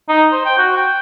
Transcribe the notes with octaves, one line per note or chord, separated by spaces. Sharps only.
D#4
C5
G5
F#4
G5